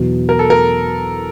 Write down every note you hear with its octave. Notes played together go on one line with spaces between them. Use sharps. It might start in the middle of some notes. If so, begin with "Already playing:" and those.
Already playing: E2 B2 F#3
A#4
A4
A#4